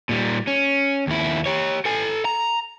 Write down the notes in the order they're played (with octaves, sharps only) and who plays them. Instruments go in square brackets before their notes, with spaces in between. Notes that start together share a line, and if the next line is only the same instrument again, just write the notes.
[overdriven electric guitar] A#2 G3
C#4
D#2 E4
G4 C#5
A4 G#5
A#5